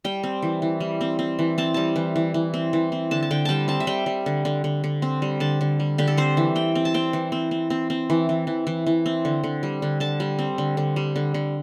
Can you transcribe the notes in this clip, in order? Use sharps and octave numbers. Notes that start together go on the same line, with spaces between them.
G3 G5
C4
E3
E3
G3
C4
C4
E3
C4 A5
G3 A5
E3
E3
E3
C4
E3
C4
D3 A5
A5
D3 G5
G3 G5 A5
C4 A5
E5
G3 G5
G3
D3
D3
D3
D3
C4
G3
D3 A5
D3
G3
D3 G4
A4
C4 C5
E3
C4 G5
C4
A5
C4 G5
E3
C4
C4
C4
C4
E3
E3
E3
E3
E3
C4
D3
D3
G3
D3
D3 A5
G3
C4
D3
D3
G3
D3
D3